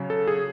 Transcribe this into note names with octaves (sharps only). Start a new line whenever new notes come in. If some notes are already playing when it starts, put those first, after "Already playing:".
Already playing: C#3 F#3
A4
G#4